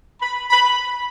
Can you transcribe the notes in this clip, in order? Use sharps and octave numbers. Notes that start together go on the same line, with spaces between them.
B5
B5